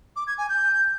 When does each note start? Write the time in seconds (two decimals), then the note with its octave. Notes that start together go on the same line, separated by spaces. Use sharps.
0.16 D6
0.27 G#6
0.38 G#5
0.49 G6